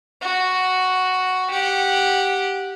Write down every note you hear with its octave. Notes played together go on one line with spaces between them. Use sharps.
F#4
G4 F#5